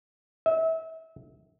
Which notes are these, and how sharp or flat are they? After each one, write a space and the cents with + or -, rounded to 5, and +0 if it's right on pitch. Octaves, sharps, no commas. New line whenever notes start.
E5 -30